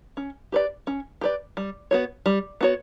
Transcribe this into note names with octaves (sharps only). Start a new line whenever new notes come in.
C#4
G4 B4 D5
C#4
G4 B4 D5
G3
B3 F#4 C#5
G3
B3 F#4 C#5